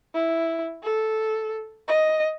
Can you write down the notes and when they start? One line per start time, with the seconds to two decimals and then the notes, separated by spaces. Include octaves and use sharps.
0.14 E4
0.83 A4
1.88 D#5